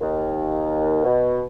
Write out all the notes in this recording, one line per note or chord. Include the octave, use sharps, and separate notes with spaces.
D#2
B2